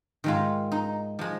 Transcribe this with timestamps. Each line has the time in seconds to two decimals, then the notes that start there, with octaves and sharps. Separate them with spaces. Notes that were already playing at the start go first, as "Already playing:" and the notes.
0.24 G#2 D#3 G#3 F4
0.72 D#4
1.19 F3 G#3